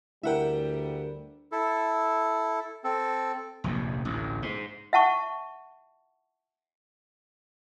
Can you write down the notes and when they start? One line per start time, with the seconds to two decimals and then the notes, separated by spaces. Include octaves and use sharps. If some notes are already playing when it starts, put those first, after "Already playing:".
0.23 D2 G3 E4 A#4 E5 F#5 G5
1.52 E4 A4
2.84 C4 A4
3.64 F1 A#1 D#2
4.05 A1 D2
4.42 G#2
4.93 E5 F#5 A5 C#6